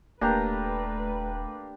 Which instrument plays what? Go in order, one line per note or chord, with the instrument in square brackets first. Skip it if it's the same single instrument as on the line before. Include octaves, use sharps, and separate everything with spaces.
[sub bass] D#1 [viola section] A3 B4 [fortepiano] A#3 [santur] D4 G4 A#5